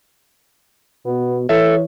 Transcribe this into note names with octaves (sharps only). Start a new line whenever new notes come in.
B2 B3
E3 A4 C#5 E5